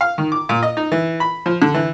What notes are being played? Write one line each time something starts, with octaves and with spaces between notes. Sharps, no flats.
F5
D#3
D6
A#2
D#5
D#4
E3
B5
F3
D3
E3